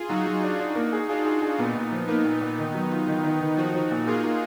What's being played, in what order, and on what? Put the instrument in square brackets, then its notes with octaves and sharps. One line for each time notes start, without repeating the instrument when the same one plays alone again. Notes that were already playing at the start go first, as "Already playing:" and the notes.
Already playing: [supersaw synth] F4 G#4
[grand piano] F#3 [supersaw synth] D#4 F#4
[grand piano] F#3
D4
D4
A#3
G#4
[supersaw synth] D4 F4 [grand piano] G#4
[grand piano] G#4
G#4
[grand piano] A#2 [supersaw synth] B3 D#4
[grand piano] A#2
F3
[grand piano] A#3 [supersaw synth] B3 D#4
[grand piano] A#2
A#2
D#3
F#3
F4
D#3
D#3
D#3
[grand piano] F3 [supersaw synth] D#4 F#4
[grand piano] F3
A#2
[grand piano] A#3 [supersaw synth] F4 G#4
[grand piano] A#3